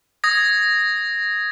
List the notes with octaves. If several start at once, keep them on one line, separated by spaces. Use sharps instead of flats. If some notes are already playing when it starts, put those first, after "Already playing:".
D#6 G#6 A#6